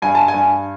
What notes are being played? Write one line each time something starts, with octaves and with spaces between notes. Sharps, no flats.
G2 G#5
A5
G#5
G2